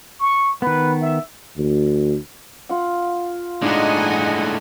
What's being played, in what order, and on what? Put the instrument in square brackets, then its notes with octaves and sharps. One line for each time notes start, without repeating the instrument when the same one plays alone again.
[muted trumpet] C#6
[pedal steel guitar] D#3 B3 [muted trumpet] B4
[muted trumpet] E5
[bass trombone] D2
[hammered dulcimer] F4 F#5
[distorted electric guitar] A2 G#3 [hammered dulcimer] D4 D#4 [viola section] D#5 F#5 G#5